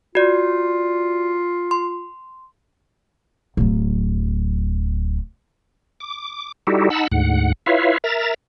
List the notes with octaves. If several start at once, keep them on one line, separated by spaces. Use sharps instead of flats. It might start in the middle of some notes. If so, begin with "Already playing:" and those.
F4 F#4 D5
C6
D1 F#3
D6
G3 D#4 E4 F#4 G4 A4
D#4 F#5 A5 B5 E6
D2 G#2 F#5
E4 F4 B4 C#5 E5 F5
A#4 E5 A#5 A6